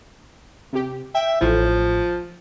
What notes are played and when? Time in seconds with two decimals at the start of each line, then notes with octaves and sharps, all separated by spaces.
0.73 C3 G4
1.15 E5 G5
1.41 A1 A2 F3